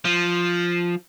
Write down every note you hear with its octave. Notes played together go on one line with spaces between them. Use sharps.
F3